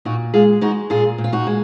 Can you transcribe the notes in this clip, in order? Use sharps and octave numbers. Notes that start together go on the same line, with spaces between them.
A#2 D#4 F#4
G#3 F4 G#4
G#3 D#4 F#4
A#2 F4 G#4
A#2
F4
D#4 F#4
G#3